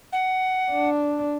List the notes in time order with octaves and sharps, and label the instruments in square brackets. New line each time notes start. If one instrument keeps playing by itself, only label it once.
[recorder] F#5
[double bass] D4